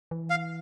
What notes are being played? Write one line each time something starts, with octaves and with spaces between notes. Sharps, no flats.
E3
F5